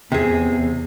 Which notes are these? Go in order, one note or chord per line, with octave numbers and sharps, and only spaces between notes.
E2 C3 G#4